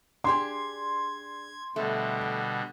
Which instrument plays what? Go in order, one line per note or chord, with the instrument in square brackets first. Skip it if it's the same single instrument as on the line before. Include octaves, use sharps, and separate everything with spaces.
[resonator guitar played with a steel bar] D4 G4 G#4 [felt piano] C6 [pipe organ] G#6
[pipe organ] B2 D3 G3 [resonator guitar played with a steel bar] A3